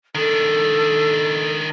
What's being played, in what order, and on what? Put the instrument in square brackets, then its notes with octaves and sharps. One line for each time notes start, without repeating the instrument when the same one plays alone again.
[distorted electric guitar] D#3 D4 [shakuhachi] A4